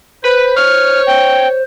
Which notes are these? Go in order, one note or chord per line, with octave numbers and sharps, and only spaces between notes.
B4 C5
C#5 F6
G5